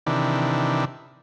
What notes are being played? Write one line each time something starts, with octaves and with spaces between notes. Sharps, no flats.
C3 D#3 E3 D4